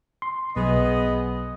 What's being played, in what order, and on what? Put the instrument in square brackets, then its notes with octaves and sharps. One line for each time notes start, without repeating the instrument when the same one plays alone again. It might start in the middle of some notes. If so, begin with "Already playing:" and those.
[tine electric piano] C6
[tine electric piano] B1 [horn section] B3 G#4 D#5